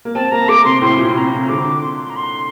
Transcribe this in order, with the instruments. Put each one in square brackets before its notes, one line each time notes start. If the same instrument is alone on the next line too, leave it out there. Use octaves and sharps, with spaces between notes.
[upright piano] A#3
[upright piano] C4 [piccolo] A5
[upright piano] A#3 [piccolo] A#5
[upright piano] A3 [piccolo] D6
[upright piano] C3 [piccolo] C6
[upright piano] A2 [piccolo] C6
[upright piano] A#2
[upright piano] C3 [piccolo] A#5
[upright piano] C3
[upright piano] D3 [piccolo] D6
[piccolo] C6
A#5
C6